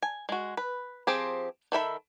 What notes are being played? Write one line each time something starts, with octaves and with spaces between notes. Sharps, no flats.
G#5
G#3 F#4
B4
F3 C4 G4 G#4
D#3 A4 E5 B5